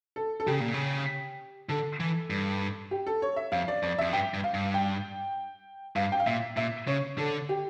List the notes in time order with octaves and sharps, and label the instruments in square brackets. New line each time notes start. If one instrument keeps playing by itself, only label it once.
[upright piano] A4
A4
[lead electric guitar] C#3 [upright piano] G4
[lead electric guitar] A#2
C#3
[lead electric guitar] D3 [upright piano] A4
[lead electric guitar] E3
G2
[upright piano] G4
A4
C#5
E5
[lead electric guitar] F2 [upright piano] F5
[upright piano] D5
[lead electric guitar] F2 [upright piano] D5
[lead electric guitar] F2 [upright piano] E5
[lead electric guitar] G2 [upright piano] G5
[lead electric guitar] G2
[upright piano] F5
[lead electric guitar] G2
[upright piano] G5
[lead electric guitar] G2 [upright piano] F5
[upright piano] G5
F5
[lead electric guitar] A#2 [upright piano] E5
[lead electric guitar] A#2 [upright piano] E5
[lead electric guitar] C#3 [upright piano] C#5
[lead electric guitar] D3 [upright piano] A4
[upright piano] G4